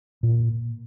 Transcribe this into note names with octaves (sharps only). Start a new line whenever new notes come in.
A#2